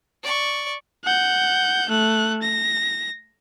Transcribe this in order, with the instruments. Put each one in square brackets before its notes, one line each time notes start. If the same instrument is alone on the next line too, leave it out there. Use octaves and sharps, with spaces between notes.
[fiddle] D5 C#6
[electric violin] F#5 G6
A3 F#6
A#6